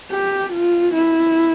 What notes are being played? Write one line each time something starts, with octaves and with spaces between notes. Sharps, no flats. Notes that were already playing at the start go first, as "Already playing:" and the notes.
G4
F4
E4